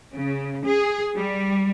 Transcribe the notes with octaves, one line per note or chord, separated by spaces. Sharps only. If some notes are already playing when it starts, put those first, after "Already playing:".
C#3
G#4
G3